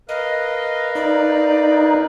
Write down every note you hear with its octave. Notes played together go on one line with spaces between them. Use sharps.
A#4 B4 D#5 F5
D#4 D5